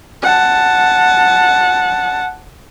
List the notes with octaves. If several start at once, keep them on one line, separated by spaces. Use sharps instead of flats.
F#5 A5